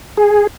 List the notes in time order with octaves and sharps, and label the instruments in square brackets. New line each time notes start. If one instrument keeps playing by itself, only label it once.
[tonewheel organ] G#4